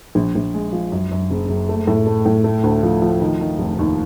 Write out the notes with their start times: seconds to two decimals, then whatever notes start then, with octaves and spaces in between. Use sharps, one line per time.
0.15 A#1
0.35 A#1
0.54 G#3
0.73 F3
0.92 F#2
1.11 F#2
1.31 F#1
1.49 F#1
1.69 A3
1.87 A2
2.06 A3
2.26 A2
2.44 A3
2.63 D2
2.83 F3
3.02 F3
3.21 D#3
3.41 D#3
3.59 F1
3.79 D#2